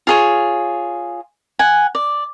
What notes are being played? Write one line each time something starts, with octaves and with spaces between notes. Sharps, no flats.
F4 G#4 C#5
F#5 G#5
D5